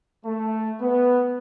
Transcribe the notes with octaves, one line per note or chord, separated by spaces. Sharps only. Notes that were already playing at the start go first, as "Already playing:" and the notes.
A3
B3